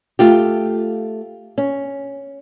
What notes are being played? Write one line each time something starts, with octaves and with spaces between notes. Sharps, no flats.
A3 F4 G4
C#4